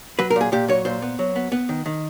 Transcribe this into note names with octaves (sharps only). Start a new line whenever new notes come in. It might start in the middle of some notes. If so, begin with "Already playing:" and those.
F#3 B4
A#4
A#2 G#4
A#2 G4
F#3 C#5
A#2 C5
B3
F#3
B3
B3
D#3
D#3